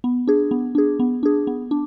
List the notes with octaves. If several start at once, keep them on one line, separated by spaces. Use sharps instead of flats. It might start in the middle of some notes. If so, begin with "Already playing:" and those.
B3
D4 G#4
B3
D4 G#4
B3
D4 G#4
B3
D4